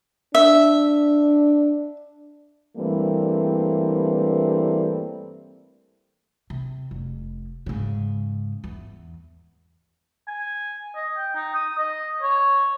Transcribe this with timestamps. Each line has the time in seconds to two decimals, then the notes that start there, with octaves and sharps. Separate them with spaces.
0.35 D4 E5
2.77 G2 E3 G3 A3 A#3 C4
6.50 C3
6.91 F1
7.66 G#2 C#3
8.64 E2
10.28 G#5
10.96 D#5
11.17 G5
11.36 D#4
11.55 D#6
11.78 D#5
12.22 C#5